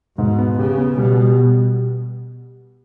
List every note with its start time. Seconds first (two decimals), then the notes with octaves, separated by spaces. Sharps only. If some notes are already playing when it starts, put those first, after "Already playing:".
0.18 G#2 B2
0.38 B3
0.58 C#3 G4
0.78 B3
0.98 B2 G3
1.18 G3